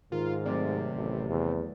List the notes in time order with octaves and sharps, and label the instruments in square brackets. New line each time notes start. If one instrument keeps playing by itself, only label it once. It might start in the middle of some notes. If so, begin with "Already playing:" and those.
[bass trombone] G#2 [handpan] D#3 A#4 [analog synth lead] F4
[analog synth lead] C3 [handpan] F#3 A3 D5
[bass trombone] A1
E2